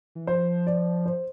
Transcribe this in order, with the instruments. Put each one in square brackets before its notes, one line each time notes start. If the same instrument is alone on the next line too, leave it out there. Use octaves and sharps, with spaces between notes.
[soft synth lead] E3
[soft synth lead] F3 [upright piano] C5
[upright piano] D5
C5